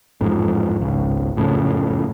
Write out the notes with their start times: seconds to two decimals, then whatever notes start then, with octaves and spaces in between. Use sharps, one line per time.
0.21 A1 F2 G#2
0.82 G#1 C#2
1.36 F#1 F2 A2 C#3